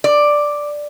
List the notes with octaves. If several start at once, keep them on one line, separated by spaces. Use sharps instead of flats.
D5